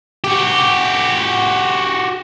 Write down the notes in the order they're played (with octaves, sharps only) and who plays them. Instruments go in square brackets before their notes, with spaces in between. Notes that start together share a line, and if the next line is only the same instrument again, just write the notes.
[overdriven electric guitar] F#4 G4